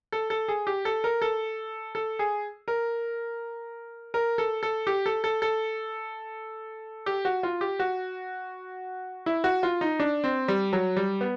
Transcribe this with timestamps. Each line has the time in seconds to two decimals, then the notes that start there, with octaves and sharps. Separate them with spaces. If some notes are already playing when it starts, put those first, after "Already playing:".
0.12 A4
0.30 A4
0.48 G#4
0.67 G4
0.85 A4
1.04 A#4
1.22 A4
1.95 A4
2.19 G#4
2.68 A#4
4.14 A#4
4.38 A4
4.63 A4
4.87 G4
5.06 A4
5.24 A4
5.42 A4
7.06 G4
7.25 F#4
7.43 F4
7.61 G4
7.79 F#4
9.26 E4
9.44 F#4
9.63 F4
9.81 D#4
10.00 D4
10.24 C4
10.48 G3
10.73 F#3
10.96 G3
11.21 B3